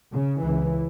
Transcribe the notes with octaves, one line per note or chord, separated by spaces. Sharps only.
C#3
C#2 C#3 E3